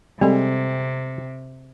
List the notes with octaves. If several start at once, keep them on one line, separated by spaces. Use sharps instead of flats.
C3 G3 G#3 C4 A4